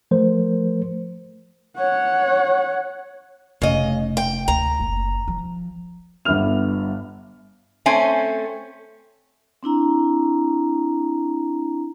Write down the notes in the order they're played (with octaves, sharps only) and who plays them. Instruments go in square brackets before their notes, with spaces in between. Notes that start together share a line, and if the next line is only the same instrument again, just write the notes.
[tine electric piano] F3 A3 A#4 C5
[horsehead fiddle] C#5 F#5
[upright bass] F1 [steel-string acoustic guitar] C#3 D#5
[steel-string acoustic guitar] G5
[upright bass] D2 [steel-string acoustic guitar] A#5
[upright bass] F#1
F3
[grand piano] G1 G2 B3 E5 F6 F7
[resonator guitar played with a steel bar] A3 C4 C#4 G#5
[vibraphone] C4 D4 E4 A#5